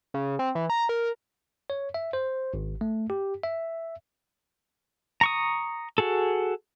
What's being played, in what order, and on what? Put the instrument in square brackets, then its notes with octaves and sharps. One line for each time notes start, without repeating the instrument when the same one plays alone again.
[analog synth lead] C#3
C4
E3
A#5
A#4
[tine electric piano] C#5
E5
C5
G#1
A3
G4
E5
[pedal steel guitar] A#5 C#6 D#6
F#4 G#4 A4